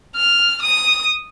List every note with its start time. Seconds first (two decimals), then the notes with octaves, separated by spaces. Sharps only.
0.16 F6
0.62 D#6